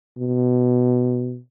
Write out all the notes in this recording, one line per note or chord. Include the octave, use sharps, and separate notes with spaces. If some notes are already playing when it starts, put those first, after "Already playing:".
B2